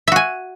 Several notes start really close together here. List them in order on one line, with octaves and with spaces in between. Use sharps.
E5 F#4 G#5